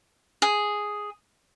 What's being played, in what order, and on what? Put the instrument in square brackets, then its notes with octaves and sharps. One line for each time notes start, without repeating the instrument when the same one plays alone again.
[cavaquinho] G#4